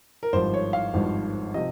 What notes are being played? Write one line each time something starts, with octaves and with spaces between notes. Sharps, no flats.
A#4
G#1 G2 F3 C5
C#5
F5
G#1 G2 F3
C3 F3 D#5